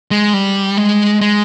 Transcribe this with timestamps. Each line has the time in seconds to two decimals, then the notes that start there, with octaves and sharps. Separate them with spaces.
0.11 G#3
0.34 G3
0.77 G#3
1.21 G#3